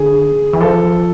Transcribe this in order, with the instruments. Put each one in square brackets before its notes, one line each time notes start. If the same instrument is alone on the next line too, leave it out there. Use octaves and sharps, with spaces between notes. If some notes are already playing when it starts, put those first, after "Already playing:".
Already playing: [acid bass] D3 [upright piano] G#4
[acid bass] E3
[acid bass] F3 [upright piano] A4